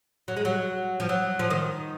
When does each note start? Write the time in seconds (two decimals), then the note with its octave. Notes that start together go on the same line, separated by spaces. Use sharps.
0.28 F#3
0.37 G#3
0.45 F#3
1.00 F3
1.09 F#3
1.39 F3
1.50 D#3